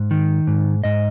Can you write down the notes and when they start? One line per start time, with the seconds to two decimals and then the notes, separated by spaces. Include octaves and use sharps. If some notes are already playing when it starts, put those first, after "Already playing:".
Already playing: G#2
0.11 D#3
0.47 G#2
0.84 G#2 D#5